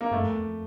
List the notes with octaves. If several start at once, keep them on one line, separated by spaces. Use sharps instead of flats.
A#3
G2 A3
F2
E2
F2